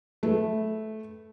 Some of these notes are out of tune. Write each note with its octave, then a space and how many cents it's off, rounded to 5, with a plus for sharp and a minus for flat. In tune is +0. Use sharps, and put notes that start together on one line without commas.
A3 -10 B4 -5